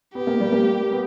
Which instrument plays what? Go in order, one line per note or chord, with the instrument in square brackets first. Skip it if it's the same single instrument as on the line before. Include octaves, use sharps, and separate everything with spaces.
[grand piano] B3 [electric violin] G4
[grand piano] A#3
G3
A#3
B3